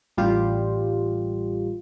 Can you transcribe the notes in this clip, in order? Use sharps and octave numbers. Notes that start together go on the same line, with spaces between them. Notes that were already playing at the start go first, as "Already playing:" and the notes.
A1 G3 F4 G4